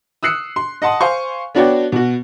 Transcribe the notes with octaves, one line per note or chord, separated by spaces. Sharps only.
D#6 E6 F#6 C7 C#7
C6
D#5 F#5 A5 C6 D#6
C5 F5 G#5 C6 C#6
B3 D4 F#4 C#5 D5 G5
B2 F#4